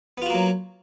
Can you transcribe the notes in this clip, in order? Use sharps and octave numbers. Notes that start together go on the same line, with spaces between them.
F#3 A#3 B3 F4 F#4